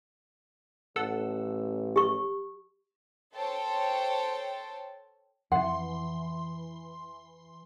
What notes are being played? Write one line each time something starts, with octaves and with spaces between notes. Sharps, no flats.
A1 A4 F#5 E6
G4 C#6
A4 C5 C#5 G5 A5
F2 E3 F#5 C6